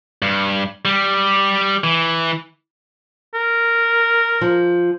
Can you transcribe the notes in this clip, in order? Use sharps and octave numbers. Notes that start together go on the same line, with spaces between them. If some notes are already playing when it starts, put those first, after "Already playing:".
G2
G3
E3
A#4
F3